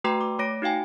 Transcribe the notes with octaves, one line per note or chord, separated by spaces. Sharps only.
A3 F#4 B4 G5 A#5 C6
D6
A3 C#5 A#6 D7
D#4 F#4 F5 G5 G#5